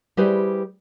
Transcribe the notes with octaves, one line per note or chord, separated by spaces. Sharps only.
G3 E4 G4 G#4 B4 C5